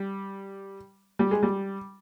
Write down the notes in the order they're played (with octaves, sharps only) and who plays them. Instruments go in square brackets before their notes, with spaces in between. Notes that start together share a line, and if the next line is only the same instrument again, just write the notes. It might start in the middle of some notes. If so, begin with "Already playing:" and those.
Already playing: [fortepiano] G3
G3
G#3
G3